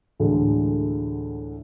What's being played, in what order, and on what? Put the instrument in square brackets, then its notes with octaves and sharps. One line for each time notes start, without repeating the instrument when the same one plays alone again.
[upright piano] D2 A2 D3 E3 G#3